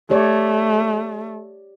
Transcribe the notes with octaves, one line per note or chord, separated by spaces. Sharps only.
A3 G4 C#5 D5